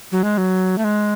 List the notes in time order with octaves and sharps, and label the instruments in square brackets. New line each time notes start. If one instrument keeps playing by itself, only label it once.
[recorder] F#3
G#3
F#3
A3
G#3